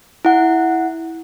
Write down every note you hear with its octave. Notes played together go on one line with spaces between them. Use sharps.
E4 F#5